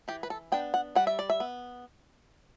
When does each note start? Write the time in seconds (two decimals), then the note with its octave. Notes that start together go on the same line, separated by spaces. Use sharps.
0.08 E3 G4
0.23 B4
0.30 A4
0.52 B3 D4 G5
0.74 F#5
0.95 G3 F#5
1.07 E5
1.19 D5
1.30 E5
1.40 B3